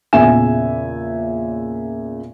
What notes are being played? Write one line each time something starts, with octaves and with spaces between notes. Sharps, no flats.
E2 A#2 C#3 E5 G#5 E7